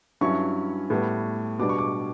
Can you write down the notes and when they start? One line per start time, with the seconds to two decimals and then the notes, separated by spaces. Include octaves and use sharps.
0.21 G2 F#3 C#4 E4 C#6
0.90 A2 G3 B3
1.59 B2 G3 D4 D6
1.69 C#6
1.78 D6